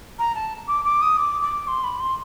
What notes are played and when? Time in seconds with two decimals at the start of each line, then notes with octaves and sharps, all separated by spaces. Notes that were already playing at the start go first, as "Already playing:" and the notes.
0.19 A#5
0.35 A5
0.68 D6
0.85 D6
1.02 D#6
1.18 D6
1.42 D6
1.68 C6
1.84 B5
2.00 C6